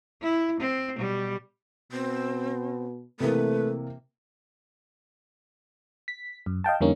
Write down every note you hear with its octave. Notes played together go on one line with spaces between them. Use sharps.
E4
C4
B2 G3
B2 C4
C3 E3 A3 A#3 B4
B6
F#2
D#5 F5 G5 A5
F2 D3 G3 A#3 C#4 D#4